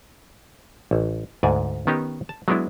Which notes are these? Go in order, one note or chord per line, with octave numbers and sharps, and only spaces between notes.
A1
D2 G#2 D5 G#5
D#3 B3 C#4 D#4 G4
A5
F#3 G#3 B3 D4 E4